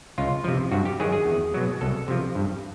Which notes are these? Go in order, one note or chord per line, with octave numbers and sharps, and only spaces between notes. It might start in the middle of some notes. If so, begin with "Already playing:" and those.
C#2 F4
C3 F3
G2 F#4
G4
D#3 F#3 G#4
G#4
E2
B2 F#3
C2 A4
C3 F3
G2